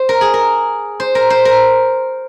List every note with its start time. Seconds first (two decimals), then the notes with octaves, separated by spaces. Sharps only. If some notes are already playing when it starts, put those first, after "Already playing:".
Already playing: C5
0.09 A#4
0.21 G#4
0.34 A#4
1.00 C5
1.15 A#4
1.30 C5
1.45 A#4